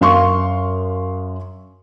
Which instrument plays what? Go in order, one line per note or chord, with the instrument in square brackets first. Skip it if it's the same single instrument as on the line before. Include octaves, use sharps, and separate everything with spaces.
[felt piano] F#2 F5 C6 C#6